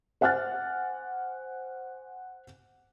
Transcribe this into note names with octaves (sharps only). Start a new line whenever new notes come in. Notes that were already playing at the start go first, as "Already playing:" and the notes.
C5 F#5 G#5 F6 F#6 A6